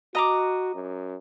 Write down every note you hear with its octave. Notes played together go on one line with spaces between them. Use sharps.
F#4 D#5 A#5 D6
F#2